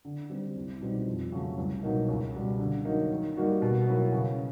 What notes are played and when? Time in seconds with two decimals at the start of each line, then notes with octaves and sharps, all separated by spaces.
0.05 D3
0.30 G3 C4
0.56 C2
0.81 B2 G3 C4 D#4
1.06 F2
1.32 C#3 F#3 A3
1.58 C2
1.83 B2 F#3 A#3 D#4
2.09 C#2
2.34 B2 G3
2.59 D3
2.85 F#3 A#3 D#4
3.11 D#3
3.36 G3 A#3 D#4 F#4
3.62 B2
3.87 F#3 A#3 C#4 E4
4.12 C#3